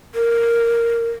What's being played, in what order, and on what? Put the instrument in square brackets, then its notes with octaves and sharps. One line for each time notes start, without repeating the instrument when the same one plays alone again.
[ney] A#4